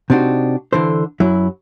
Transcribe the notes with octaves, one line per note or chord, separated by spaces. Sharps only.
C3 C4 D4 D#4 F#4
D3 E3 A4 C5
F#2 F#3 E4